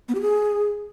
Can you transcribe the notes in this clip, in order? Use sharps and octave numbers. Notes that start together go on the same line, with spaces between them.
B3
G4
G#4